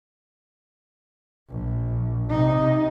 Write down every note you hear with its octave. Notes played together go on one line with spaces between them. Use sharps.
A#1
C3 D#4